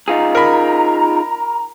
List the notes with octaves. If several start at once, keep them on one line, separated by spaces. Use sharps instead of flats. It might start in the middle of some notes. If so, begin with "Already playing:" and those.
D#4 F4 G#4 A#5
A#4 B5